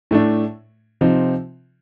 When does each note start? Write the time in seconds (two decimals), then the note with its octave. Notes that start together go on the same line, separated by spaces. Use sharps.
0.11 A2 A3 D4
1.01 C3 F3 C4 D#4